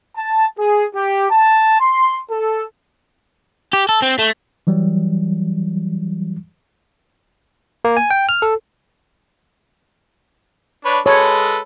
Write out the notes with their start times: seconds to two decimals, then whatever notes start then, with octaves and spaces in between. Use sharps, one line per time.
0.16 A5
0.58 G#4
0.95 G4
1.30 A5
1.81 C6
2.30 A4
3.73 G4
3.89 A4
4.02 C4
4.18 A3
4.67 E3 F#3 G3
7.85 A#3
7.97 G#5
8.11 G5
8.29 F6
8.42 A4
10.85 D4 B4 C#5
11.06 G#3 A4 B4 C#5